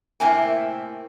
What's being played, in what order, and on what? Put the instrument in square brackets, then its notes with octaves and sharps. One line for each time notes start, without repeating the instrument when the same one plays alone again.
[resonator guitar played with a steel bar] A2 C3 A#3 C4 E4 G#5